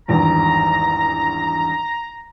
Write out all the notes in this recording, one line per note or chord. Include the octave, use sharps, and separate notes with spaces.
G#1 E2 G2 A#5